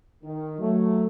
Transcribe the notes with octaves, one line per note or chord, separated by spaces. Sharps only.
D#3
F#3 A3